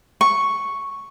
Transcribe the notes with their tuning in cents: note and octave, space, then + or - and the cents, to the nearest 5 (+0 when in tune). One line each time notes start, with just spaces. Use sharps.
C#6 +0